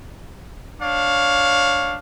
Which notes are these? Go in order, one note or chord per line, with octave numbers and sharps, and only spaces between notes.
D4 C#5 F5